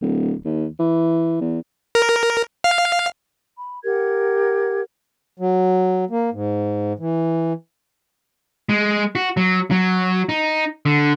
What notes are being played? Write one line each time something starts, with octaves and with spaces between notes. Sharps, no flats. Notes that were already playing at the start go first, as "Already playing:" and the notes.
D1
D#2
E3
E2
A#4
F5
B5
G4 A#4 F#5 G#6
F#3
A#3
G#2
E3
G#3
F#4
F#3
F#3
D#4
D3